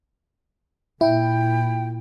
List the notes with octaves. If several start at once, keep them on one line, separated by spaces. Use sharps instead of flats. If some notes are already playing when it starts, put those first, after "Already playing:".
A#2 E4 G5